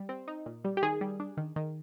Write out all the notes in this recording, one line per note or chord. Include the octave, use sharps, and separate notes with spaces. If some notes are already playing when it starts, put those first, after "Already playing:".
Already playing: G3
C4
D#4
A#2
G3
G4
D#3 G#4
G3
D4
D#3
D#3